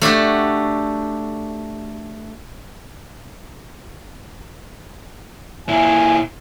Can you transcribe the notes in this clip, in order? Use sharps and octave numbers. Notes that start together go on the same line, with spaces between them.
A3 D4 F#4 G4
A#2 E4 G#5